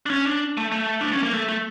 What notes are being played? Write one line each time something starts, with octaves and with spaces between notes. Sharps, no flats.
D4
C#4
D4
A3
A3
D4
C#4
A#3
A3
A3